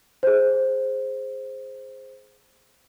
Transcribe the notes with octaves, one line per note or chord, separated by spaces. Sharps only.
G#4 C5